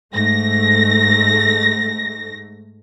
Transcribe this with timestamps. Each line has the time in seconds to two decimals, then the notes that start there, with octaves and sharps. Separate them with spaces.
0.15 G#2 A3 A#6